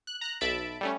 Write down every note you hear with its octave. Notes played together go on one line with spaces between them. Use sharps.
F#6
A#5 F#6
B1 E5 A5 B5 D7
G3 A3 C#4